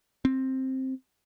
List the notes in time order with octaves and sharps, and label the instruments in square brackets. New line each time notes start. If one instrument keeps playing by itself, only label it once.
[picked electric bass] C4